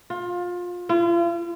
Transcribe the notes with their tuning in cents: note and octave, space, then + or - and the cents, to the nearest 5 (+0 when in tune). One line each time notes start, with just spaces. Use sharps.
F4 +25
F4 -40